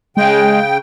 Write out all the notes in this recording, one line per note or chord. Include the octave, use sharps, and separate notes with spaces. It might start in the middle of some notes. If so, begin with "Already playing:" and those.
C#3 G#3 G5